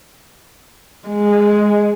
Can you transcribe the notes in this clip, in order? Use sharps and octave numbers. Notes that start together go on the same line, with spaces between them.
G#3